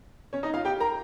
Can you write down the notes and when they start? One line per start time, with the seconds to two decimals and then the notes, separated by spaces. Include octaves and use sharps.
0.33 C#4 C#5
0.43 D#4 D#5
0.54 F4 F5
0.65 G4 G5
0.80 A#4 A#5